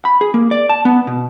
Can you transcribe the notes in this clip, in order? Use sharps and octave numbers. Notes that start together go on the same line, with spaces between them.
B5
G#4
A#3
D5
A5
B3
B2